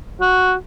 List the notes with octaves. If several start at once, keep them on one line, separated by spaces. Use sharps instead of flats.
F#4